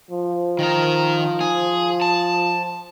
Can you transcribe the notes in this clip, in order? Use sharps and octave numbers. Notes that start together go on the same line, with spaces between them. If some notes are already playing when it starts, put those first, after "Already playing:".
F3
D#3 A#4
G#4
A5